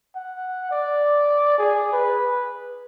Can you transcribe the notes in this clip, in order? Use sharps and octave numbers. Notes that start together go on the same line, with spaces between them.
F#5
D5
G#4
B4